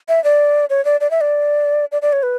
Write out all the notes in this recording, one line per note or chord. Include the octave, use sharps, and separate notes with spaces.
E5
D5
C#5
D5
D5
E5
D5
D5
D5
C#5
B4